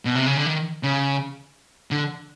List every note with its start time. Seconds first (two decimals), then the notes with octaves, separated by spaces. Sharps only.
0.05 B2
0.15 C3
0.26 C#3
0.37 D3
0.46 D#3
0.83 C#3
1.91 D3